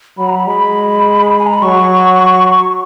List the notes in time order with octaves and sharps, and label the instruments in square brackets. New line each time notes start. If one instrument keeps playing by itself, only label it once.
[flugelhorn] F#3 [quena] B5
[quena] A#5
B5
[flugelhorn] G#3 [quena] B5
[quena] G#5
A#5
B5
[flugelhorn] F#3 [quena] C#6